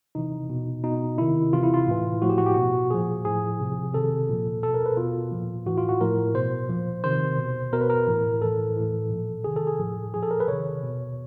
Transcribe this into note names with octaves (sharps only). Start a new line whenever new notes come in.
C3 E3 D#4
B2
B2 D#4
C3 D#3 E4
C3 E3 F4
E4
F4
A2 E3
A2 F3 F#4
G4
F#4
G4
B2 F#4
A#2 F3 G#4
A2 F3 G#4
C3 F3
C3 D#3 A4
A#2 F3
B2 A4
A#4
B4
B2 F4
A#2 F3
A2 E3 F#4
F4
F#4
A2 F3 A#4
B2 C5
A#2 F3
C3 D#3 C5
B2
B2 A#4
B4
A#4
A2 E3
A2 E3 A4
A2 E3
A#2 F3
C3 D#3 G#4
A4
G#4
A2 F3
A#2 F3 G#4
A4
A#4
B4
C3 D#3 C#5
B2